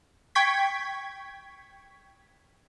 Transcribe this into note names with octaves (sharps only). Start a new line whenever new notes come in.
G5 C#6 G#6 B6